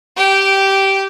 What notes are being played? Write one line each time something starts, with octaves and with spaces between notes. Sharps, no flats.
G4 G5